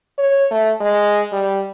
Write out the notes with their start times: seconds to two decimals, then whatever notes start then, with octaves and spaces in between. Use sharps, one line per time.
0.18 C#5
0.51 A3
0.80 G#3
1.32 G3